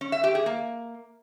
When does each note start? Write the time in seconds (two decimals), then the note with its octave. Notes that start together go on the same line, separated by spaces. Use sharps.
0.01 C#4
0.12 E5
0.24 G4
0.35 G#4
0.46 A#3